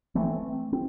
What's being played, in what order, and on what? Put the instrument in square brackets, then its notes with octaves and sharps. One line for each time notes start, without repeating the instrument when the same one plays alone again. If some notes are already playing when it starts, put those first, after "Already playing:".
[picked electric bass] E3 A3 C4
C4